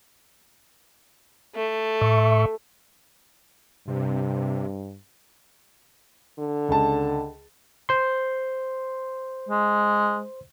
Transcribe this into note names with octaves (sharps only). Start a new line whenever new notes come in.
A3
A2 E5 C#6
G2 C3
D3
C#2 A5
C5 C6
G#3